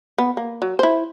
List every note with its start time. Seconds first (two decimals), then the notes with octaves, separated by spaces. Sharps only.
0.18 B3
0.37 A#3
0.62 F#3
0.79 E4 C5